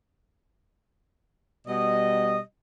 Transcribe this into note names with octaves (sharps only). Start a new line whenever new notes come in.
B2 G3 D#5